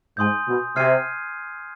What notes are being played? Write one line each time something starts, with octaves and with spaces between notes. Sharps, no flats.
G#2 G#5 C6 D#6 G6
B2
C3 F6 G#6 C7 D#7